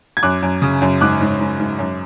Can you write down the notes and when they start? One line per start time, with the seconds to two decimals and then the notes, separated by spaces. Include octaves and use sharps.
0.17 G#6
0.23 F#2 D6 F#6
0.43 F#2
0.62 C#3
0.82 F#2
1.01 G#2 D6 F#6
1.21 G#2
1.40 G#2
1.60 G#2
1.79 F#2